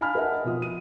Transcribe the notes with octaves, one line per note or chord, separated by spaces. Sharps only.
F5 G#5 A5 B5 F6
A#4 D#5 E5 F#5
B2 F3 F4 D#6
D#7